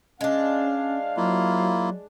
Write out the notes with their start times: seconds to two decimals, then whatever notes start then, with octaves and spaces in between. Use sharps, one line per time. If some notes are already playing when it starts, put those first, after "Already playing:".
0.21 G#3 C#4 D4 F5
1.17 F#3 A#3 E4 F4